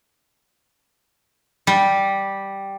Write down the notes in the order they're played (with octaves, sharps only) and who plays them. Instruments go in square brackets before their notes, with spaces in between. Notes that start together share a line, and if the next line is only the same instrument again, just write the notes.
[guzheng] G3